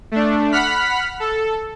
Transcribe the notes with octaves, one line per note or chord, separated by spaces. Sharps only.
A3 D4
F#5 B5 F6 B6
A4